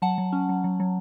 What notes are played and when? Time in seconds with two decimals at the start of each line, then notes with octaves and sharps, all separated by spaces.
0.02 F#3 F#5 A5
0.18 F#3
0.33 C#4
0.49 F#3
0.64 F#3
0.80 F#3